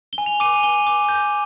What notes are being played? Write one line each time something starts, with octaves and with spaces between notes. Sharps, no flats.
G7
G#5
F7
D6 D#7
G#5 G7
D6
G6